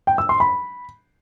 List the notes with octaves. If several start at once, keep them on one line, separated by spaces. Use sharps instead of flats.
G5
E6
C6
B5